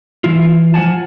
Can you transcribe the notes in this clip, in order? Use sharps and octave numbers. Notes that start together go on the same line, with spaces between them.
E3 E4 F4
F3 F4 F#5 G#5 A5